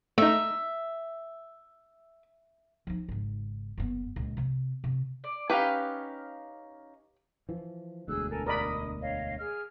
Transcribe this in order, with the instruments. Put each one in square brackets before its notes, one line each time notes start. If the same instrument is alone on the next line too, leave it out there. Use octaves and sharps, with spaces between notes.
[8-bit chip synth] A3 D#4 [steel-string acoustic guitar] E5
[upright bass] F3 D#4
G#1 C#3
F#1 B3
C#2 A#2
C3 C4
C3
[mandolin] D5
[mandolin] C#4 D#4 F5 [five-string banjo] G4 B4
[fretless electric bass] E3 F3
[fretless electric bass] E1 D2 [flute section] G#4 E6 F#6
[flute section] A4 A#4 G#5
[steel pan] A#4 D5 B5 [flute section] D#5 D#6
[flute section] C#5 D#5 F5
G#4 F6